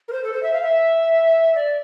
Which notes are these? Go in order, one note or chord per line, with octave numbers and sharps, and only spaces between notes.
A#4
C5
A4
C5
E5
F5
E5
D5